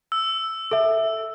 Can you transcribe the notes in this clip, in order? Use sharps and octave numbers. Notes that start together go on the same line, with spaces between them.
E6
A4 E5